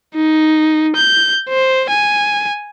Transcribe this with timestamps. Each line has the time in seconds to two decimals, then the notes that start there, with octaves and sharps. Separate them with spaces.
0.15 D#4
0.96 G6
1.49 C5
1.90 G#5